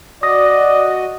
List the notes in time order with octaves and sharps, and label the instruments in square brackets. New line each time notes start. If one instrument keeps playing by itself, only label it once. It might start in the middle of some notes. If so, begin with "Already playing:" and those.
[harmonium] F#4 D#5 [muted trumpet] D5 [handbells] D#6 A#6